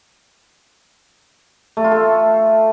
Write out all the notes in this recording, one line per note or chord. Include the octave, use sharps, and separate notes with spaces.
A3
F4
A4